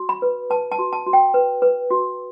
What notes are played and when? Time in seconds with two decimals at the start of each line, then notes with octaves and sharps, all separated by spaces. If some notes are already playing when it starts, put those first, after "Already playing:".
Already playing: F#4
0.09 B5
0.22 B4
0.50 B4 A5
0.72 A5
0.79 F#4
0.93 A5
1.07 F#4
1.13 G5
1.34 B4
1.62 B4
1.91 F#4